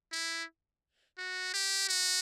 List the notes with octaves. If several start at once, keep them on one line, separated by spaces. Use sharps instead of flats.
E4
F#4
G4
F#4